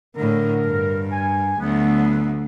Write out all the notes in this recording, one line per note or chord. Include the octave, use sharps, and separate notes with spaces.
A2 D3 A#4
G2
G#5
D2 F#3 B3